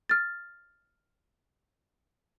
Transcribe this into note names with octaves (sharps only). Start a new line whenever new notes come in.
F6 A6